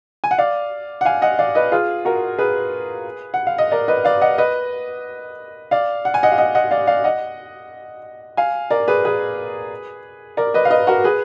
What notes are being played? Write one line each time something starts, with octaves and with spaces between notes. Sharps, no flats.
G#5
F#5
D5 F5
F#5
F5 G#5
D#5 F#5
D5 F5
B4 D#5
F4 G#4
F#4 A#4
G#4 B4
F#5
F5
D#5
A#4 D5
B4 D#5
D5 F5
D#5 F#5
B4 D#5
D5 F5
F#5
G#5
D#5 F#5
F5
D#5 F#5
D#5 F#5
D5 F5
D5 F5
D#5 F#5
F5 G#5
A#4 D5
G#4 B4
G#4 B4
A#4 D5
B4 D#5
F5
B4 D#5
F#4 A#4
G#4 B4